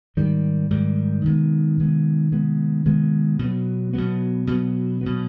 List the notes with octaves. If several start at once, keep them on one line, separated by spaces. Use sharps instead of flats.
G#2 D#3 G3
G#2 D#3 G3
C3 D#3 G#3 B3
C3 D#3 G#3 B3
C3 D#3 G#3 B3
C3 D#3 G#3 B3
B2 F#3 B3
B2 F#3 B3
B2 F#3 B3
B2 F#3 B3